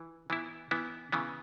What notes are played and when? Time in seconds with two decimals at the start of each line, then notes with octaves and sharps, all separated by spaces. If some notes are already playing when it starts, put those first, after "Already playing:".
Already playing: E3
0.30 E3 B3 E4
0.71 E3 B3 E4
1.12 C#3 E3 B3